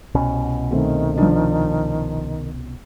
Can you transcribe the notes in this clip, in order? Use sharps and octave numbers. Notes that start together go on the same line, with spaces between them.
C2 B2 C#4
D#3 A3 C4
F3 D4